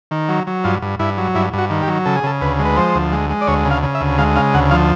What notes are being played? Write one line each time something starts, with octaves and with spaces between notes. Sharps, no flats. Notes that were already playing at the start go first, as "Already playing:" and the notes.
D#3
F#3
F#3
G2 F4
G2
G2 E4
F#3
G2 E4
G2
F#4
D#3
G4
F#3
C#3 A4
G#4
C#3 A4
D2 B4
G#3
B4
F3 C5
D2
G#3
G#3
D5
D2 C#5
C#3
F5
C#3
E5
D2
G#3 F5
C#3 F5
D2 F#5
F3 F5